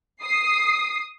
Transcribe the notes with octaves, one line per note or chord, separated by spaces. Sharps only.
D#6 C7